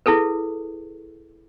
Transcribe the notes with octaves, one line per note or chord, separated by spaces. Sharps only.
E4 G#4 A4 B4